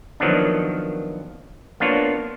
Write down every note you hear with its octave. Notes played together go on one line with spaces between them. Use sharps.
D#3 F3 F#3 A#3 B3 D4
A#3 B3 D4 F4 C#5